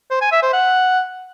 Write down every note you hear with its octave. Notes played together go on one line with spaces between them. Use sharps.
C5
G#5
E5
C5
F#5